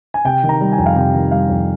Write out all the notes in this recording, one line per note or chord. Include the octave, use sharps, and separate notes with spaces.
G#5
C3 G5
D#3
A#5
G3
G#5
F2
F5
C3 G5
D#3
G3 F5
F2